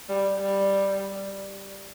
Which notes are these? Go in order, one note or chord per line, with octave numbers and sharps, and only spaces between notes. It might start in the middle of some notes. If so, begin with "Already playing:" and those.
G3
G3